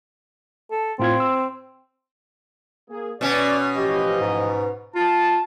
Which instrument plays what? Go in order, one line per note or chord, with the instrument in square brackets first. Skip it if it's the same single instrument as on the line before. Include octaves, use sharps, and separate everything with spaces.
[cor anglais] A4
[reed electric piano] A2 F4 G#6 [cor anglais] C4
[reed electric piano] E6
[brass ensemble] A#3 G#4
[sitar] B2 C#4 [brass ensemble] D5
[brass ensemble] A1 F3 D#5 [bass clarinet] G4
[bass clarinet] G#2
[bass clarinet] F4 [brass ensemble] A5